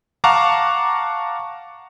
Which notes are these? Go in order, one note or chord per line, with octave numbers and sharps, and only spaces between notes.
F5 F#5 A5 A#5 C#6 D6